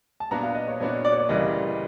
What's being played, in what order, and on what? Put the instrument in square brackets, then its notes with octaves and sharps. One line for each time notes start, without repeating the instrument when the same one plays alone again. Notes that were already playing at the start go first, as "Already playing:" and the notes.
[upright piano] A5
[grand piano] A#2 F#3 B3 D4 F#4 [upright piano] A#5
[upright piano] F5
D#5
C#5
[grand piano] A#2 F#3 B3 D4 F#4 [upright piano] C#5
[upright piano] D5
C#5
D5
[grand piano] D2 C#3 E3 G3 A#3 [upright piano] D#5